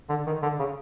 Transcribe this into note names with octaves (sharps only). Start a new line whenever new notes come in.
D3
D#3
D3
C#3